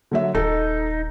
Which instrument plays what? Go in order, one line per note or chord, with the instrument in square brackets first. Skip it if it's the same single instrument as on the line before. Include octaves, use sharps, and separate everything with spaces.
[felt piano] D3 F#3 E5
[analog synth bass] D#1 [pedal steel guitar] D#4 [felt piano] A4